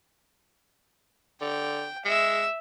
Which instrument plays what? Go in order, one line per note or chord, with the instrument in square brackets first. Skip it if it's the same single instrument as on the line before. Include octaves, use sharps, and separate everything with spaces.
[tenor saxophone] D3 [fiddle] G5
[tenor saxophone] G#3 [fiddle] E5 E6